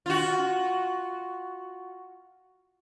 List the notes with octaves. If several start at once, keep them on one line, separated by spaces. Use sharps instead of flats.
F4 F#4